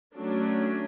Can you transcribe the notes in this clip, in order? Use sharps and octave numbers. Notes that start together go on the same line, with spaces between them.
F#3 A3 C#4 D4